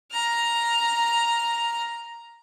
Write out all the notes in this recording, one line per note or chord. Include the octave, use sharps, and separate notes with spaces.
A#5 F6